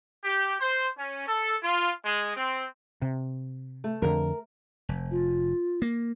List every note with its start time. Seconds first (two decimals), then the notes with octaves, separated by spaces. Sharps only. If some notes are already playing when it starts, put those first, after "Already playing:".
0.24 G4
0.60 C5
0.98 C#4
1.28 A4
1.64 F4
2.05 G#3
2.37 C4
3.02 C3
3.84 A3
4.02 F2 D3 A#4
4.89 F1
5.11 F4
5.82 A#3